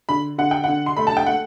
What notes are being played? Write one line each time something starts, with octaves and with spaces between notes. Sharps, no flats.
D3 B5
D3 F#5
G5
D3 F#5
C6
A3 B5
A5
G5
A3 F#5